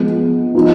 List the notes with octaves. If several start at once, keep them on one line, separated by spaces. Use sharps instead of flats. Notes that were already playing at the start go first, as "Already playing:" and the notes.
Already playing: F3 G#3 B3
F3 B3 D#4 F#4